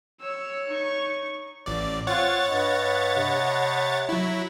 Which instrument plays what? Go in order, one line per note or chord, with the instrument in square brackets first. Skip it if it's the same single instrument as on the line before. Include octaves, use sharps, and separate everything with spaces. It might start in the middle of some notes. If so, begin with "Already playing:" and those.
[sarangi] C#5 [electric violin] E6
[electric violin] D#4 C#6
[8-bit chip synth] A1 D5
[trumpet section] C4 F4 [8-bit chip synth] C#5 F#5 A6
[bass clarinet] G2 [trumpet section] D#5 B5
[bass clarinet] C3
[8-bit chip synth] F#3 E4